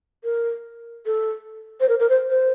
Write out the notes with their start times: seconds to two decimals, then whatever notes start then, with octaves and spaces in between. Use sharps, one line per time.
0.24 A#4
1.06 A4
1.80 C5
1.89 A#4
2.00 A#4
2.10 C5
2.30 C5